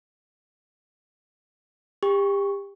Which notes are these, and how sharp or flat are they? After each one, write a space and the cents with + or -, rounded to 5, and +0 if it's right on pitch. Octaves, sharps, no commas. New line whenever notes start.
G4 +30 C#6 +0